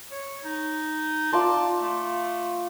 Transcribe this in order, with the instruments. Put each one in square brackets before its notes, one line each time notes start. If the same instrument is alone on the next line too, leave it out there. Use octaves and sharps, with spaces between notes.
[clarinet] C#5
D#4
[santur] F4 D5 C6 [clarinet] A5
[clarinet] A3